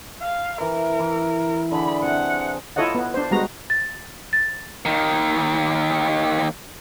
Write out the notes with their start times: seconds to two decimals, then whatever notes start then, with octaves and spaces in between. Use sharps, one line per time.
0.22 F5
0.60 E3 A#4
0.99 E3
1.72 D3 G#4 B5
2.03 C3 F#5
2.76 E4 F4 A4 C#5 D#5 F#5
2.95 B3
3.14 D4 C5
3.31 G3 G#3 B3 F#4 A#5
3.70 A6
4.33 A6
4.85 D#2 D#3